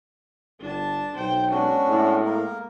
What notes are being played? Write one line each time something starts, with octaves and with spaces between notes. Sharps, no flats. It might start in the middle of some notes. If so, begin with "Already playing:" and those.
G1 D4 A5
B1 C5 G5
G#3 B3 C#4 D4 F#4
A2
A#3 A#4